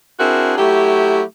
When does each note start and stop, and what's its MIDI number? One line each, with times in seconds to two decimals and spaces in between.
0.20 0.54 60
0.20 0.54 62
0.20 0.54 64
0.20 0.54 66
0.20 0.54 68
0.20 0.54 70
0.58 1.22 54
0.58 1.22 57
0.58 1.22 64
0.58 1.22 67